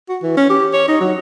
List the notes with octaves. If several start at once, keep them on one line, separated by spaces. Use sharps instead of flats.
F#4
E3
C#4
G4
C#5
D#4
F#3